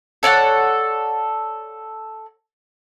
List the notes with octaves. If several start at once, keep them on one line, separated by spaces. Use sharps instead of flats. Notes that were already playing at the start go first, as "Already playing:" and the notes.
A4 C#5 D5 F#5